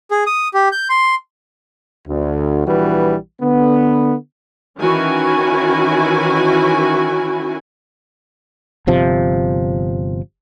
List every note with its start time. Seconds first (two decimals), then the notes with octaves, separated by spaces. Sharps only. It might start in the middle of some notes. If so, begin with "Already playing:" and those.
0.11 G#4
0.27 D#6
0.54 G4
0.72 G6
0.89 C6
2.07 D2
2.66 A#1 E3 G3 F#4 B4
3.41 D3 B3
4.80 D#3 E3 C#4 E4 F#4 G#5
8.87 G1 C3 F3